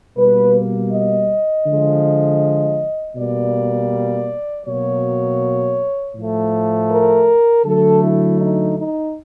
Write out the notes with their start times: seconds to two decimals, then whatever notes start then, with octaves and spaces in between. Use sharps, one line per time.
0.17 B2 G3 A#3 B4
0.92 D#5
1.67 D3 F3 G#3
3.16 B2 G3 A#3 D5
4.66 B2 F#3 A#3 C#5
6.15 A2 F3 A3
6.91 A#4
7.65 D3 F#3 A3 A4
8.02 E4
8.40 D#4
8.78 D#4